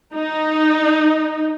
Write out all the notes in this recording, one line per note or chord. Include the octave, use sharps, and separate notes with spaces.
D#4